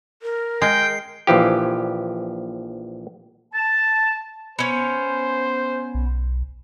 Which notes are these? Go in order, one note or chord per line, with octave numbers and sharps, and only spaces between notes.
A#4
G#3 G5 C7
A#1 E3 F3 G4
A5
B3 C#4 C5
B1